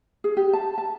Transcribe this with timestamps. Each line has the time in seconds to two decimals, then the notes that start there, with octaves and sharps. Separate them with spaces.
0.24 G#4
0.37 G4
0.53 A5
0.78 A5